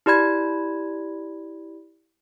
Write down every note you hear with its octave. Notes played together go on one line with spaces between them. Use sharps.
E4 G4 D5 B5 G#6